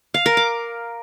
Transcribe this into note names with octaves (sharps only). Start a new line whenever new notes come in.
F5
A#4
D6